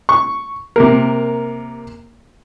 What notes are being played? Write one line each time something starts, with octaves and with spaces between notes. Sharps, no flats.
C#6
C3 A#3 A#4